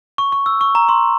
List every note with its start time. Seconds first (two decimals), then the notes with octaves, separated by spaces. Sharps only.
0.18 C#6
0.32 C#6
0.46 E6
0.61 C#6
0.75 A#5
0.89 C6